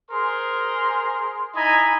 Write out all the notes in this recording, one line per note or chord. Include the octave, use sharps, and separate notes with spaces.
G#4 A#4 C5 C6
D#4 E4 D#5 G#5 A#5 B5